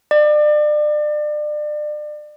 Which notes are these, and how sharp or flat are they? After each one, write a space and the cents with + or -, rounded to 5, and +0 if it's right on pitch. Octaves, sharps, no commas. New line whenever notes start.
D5 +30